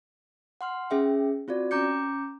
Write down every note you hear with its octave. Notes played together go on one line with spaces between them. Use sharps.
F#5 C6 F6
C#4 G#4 E5 G5
C4 F4 F#4 D5
C#4 A#5 D6 G6 C#7